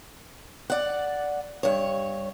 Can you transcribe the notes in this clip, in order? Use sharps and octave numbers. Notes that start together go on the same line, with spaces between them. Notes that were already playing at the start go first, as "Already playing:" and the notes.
D5 F#5
G2 C#5